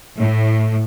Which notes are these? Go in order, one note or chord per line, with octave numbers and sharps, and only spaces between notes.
A2